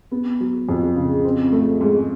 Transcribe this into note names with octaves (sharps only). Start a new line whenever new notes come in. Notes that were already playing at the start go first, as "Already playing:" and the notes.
B3
F#3
F2
C#3
C4
A3
G#2